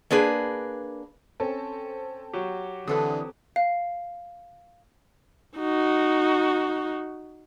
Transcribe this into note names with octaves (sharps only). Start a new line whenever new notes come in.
A#3 D4 G#4 B4
C4 C#4 A4
F#3 F#4 G4
D3 E3 C4 A4 B4 D#6
F5
D#4 F#4